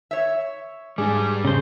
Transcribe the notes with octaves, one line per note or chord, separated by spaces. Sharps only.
C#5 E5
G#2 G3 D4 G#4 D6
C#3 C5